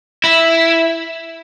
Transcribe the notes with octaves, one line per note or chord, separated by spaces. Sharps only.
E4